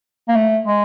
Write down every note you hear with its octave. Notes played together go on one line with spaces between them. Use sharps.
A#3
A3
G#3